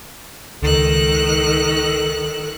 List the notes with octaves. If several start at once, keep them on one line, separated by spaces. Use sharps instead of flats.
C#2 D#3 A4 F#6